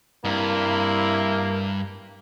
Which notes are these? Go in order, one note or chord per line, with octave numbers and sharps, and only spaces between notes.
G2 C3 A#3 E4